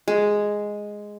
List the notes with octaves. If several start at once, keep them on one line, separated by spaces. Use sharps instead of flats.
G#3